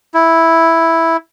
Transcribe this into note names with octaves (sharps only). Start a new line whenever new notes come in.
E4